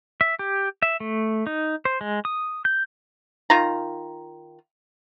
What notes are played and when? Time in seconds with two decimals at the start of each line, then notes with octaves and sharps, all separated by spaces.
0.21 E5
0.39 G4
0.82 E5
1.00 A3
1.47 D#4
1.85 C5
2.01 G#3
2.25 D#6
2.65 G6
3.50 D#3 F4 A#5